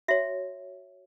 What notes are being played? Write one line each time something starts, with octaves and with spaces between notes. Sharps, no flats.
F#4 C#5 E5